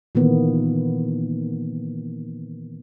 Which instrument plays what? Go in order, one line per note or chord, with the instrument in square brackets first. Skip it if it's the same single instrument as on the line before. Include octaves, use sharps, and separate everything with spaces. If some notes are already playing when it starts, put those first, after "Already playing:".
[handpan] A#2 D#3 E3 A#3 B3